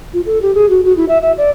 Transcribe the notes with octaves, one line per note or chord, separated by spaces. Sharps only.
F4
A4
G4
G#4
F#4
F#4
E4
E5
E5
D5